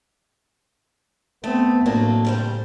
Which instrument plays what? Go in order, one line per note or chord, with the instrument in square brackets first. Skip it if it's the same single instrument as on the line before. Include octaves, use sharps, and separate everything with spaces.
[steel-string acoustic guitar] A3 [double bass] B3 C4
[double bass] A2 [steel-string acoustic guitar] F#3 A#3 D4
[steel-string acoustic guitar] C#3 G3 C5